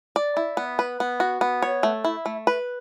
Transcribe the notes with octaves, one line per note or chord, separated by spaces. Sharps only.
D5
E4
B3
B4
B3
F#4
B3
C#5
A3
E4
A3
B4